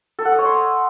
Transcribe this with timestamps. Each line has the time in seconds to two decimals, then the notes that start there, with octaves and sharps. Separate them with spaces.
0.19 A4
0.25 F#5
0.32 D#5
0.39 C#5
0.45 C6